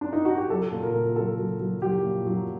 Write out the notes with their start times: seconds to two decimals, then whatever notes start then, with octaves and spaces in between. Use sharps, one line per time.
0.01 D4
0.13 D#4
0.25 F#4
0.38 G4
0.50 F#3 A4
0.72 A#2
0.83 A#4
0.94 A#2
1.16 F#3 A4
1.38 F#3
1.60 F#3
1.82 F#3 G4
2.04 A#2
2.26 F#3